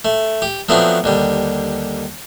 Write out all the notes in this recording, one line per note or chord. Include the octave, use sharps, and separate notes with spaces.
A3
G4
F3 F#3 A3 B3 C4 D4
D#2 D3 G3